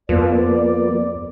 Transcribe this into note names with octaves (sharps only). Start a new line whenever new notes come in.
F2 F3 A#3 B3 D5